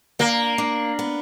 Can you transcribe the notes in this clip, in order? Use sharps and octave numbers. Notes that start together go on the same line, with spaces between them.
A#3 D4
D4
B3